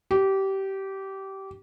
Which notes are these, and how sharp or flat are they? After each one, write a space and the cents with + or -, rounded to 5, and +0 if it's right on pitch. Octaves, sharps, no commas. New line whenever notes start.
G4 -20